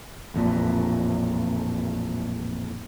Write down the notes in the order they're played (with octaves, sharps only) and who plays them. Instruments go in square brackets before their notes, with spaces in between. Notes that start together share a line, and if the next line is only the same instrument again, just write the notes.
[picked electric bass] A1 F2 A#2